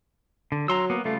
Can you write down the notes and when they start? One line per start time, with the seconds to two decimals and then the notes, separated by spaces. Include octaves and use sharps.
0.52 D3
0.68 F#3 A#5 C6 E6
0.90 A#3 B3
1.05 C#3 G3 A3 F4